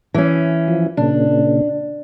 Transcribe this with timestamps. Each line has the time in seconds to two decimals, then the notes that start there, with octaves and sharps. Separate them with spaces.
0.14 E3 C#4
0.68 F3
0.97 A#2 C#3 D4